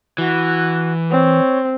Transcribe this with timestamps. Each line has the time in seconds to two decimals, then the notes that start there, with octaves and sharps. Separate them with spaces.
0.18 E3 F#4
1.11 C4 C#5